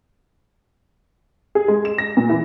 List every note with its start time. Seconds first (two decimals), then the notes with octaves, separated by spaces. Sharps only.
1.55 G#4
1.68 G#3
1.85 E7
1.98 A#6
2.17 A#2
2.30 E3